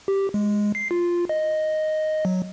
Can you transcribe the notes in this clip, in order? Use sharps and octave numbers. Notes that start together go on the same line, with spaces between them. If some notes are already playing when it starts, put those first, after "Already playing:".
G4
G#3
C7
F4
D#5
F#3